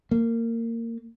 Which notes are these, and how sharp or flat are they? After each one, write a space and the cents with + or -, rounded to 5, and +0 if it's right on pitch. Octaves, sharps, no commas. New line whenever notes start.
A#3 -20